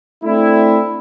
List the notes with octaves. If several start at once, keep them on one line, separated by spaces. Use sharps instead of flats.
A3 C4 D4 E4